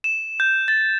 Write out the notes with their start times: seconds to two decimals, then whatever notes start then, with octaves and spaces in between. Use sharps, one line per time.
0.04 E7
0.40 G6
0.68 A6